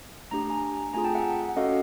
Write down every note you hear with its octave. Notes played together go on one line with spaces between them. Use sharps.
A3 D4 G4 A#5
G#5 A#5
A3 C4 F4 G#4 G#5 A#5
G5 A5
E5 F#5
F#5
C#4 F#4 A4 D#5 F5